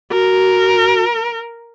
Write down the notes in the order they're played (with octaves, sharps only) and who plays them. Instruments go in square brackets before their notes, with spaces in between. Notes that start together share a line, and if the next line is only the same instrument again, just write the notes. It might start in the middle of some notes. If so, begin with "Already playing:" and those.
[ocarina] F#4 [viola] A#4